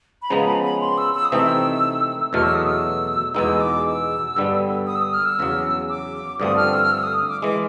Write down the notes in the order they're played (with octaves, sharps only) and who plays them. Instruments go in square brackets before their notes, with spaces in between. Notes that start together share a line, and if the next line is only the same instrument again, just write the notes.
[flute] B5
[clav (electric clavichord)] C#3 F3 G#3 B3 [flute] A#5
[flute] B5
B5
C6
E6
E6
D#6
[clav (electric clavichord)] C3 E3 A3 C4 D#4 [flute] E6
[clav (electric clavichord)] E2 B2 F#3 A3 [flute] F6
[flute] E6
D#6
E6
[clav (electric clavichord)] E2 B2 G#3 B3 D#4 [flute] E6
[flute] D6
E6
[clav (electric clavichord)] G2 D3 G3 B3
[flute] D#6
E6
D#6
F6
E6
[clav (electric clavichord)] E2 C#3 F#3
[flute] D6
[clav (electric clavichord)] G2 D3 F3 A3 C4 [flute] D#6
[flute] F6
E6
F6
E6
D#6
D6
[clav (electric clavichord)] E3 G#3 [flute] D6